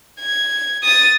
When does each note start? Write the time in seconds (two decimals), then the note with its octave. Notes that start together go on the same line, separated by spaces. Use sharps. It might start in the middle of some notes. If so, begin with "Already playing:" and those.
0.20 G#6
0.84 D#6 A6